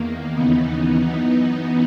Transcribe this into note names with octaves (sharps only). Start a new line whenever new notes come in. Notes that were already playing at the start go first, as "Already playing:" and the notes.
Already playing: E2 D#3 A#3
D#2 C#3 E3 B3 D#4
F#2 E3 B3 D#4